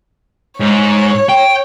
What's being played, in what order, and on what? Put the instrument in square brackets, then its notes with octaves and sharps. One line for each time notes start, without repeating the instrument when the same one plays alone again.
[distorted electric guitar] G#2 [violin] C#5
[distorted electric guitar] G5